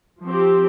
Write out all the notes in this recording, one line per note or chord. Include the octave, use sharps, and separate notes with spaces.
F3 C4 G4